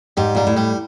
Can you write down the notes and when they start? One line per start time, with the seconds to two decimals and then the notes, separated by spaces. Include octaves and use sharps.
0.17 G#2 G3
0.35 A#2 G3
0.47 A2
0.57 G3